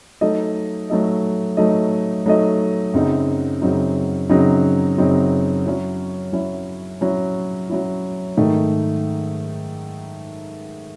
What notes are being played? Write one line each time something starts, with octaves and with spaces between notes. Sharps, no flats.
F#3 A3 D#4 A4 D#5
F#3 A3 D#4 A4 D#5
F#3 A3 D#4 A4 D#5
F#3 A3 D#4 A4 D#5
F#2 C#3 F#3 C4 D#4
F#2 C#3 F#3 C4 D#4
F#2 C#3 F#3 C4 D#4
F#2 C#3 F#3 C4 D#4
F#3 C#4 E4
F#3 C#4 E4
F#3 C#4 E4
F#3 C#4 E4
G#2 D#3 A3 D#4